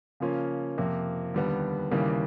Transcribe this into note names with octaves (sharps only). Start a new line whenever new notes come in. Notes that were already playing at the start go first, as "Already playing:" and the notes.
C#3 F3 A#3 C#4 F4
F2 C3 F3 A#3
D#2 D3 G3 B3
D#2 C#3 E3 G3 A#3